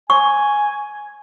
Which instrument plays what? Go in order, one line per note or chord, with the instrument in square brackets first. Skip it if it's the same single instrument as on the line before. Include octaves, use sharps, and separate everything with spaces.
[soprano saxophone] G#5 [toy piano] C#6